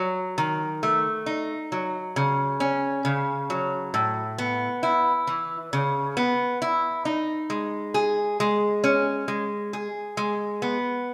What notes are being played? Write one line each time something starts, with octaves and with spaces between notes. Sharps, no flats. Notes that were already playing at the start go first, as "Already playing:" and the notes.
Already playing: F#3
D#3
A3
D#4
F#3
C#3
C#4
C#3
F#3
A2
B3
E4
E3
C#3
B3
E4
D#4
G#3
G#4
G#3
C#4
G#3
G#4
G#3
B3